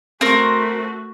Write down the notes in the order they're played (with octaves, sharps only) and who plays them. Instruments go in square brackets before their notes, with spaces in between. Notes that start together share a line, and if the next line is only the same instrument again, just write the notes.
[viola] A3 F#4 [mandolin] C4 A#4